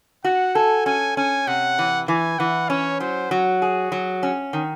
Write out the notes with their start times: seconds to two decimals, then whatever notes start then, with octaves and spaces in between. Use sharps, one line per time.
0.24 F#4 F#5
0.55 A4 G#5
0.86 C#4 G#5
1.17 C#4 G#5
1.47 C3 F#5
1.78 E3
2.08 E3 G#5
2.39 E3 F#5
2.69 C#4 C#5
3.00 F#3 C5
3.31 F#3 F#4
3.62 G#4
3.92 F#3
4.23 C#4
4.53 D#3